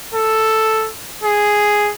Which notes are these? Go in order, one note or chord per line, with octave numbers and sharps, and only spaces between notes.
A4
G#4